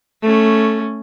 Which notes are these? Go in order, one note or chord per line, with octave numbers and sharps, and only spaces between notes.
A3 C#4